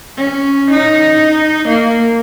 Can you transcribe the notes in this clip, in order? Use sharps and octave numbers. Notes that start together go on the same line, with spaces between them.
C#4
D#4
A#3